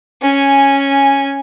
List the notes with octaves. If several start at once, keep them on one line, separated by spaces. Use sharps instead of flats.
C#4 G#5